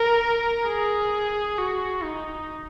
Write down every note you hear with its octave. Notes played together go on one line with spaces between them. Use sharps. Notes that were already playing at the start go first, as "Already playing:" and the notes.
Already playing: A#4
G#4
F#4
D#4